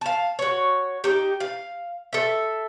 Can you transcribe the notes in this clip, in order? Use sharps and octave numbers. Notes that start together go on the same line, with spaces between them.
F5 A5
F#4 C#5
D#4 G4
F5
A4 E5